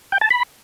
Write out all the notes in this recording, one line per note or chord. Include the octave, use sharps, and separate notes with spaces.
G5
A5
B5